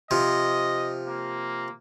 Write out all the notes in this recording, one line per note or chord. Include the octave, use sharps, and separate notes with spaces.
C3 F3 D#5
A#3